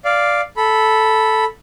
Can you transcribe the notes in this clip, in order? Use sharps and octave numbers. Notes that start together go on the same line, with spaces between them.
D5 F5
A4 B5